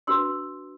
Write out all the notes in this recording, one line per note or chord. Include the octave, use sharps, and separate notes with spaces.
D4 F#4 B4 C6 E6